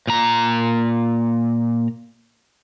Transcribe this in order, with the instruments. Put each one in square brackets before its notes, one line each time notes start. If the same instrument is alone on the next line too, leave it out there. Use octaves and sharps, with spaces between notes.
[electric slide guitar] A#2 A#5